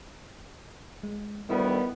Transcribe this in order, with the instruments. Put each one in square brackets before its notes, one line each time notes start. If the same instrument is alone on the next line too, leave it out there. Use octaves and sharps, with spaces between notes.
[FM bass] G#3
[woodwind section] D2 D#3 G3 [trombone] B3 [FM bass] E4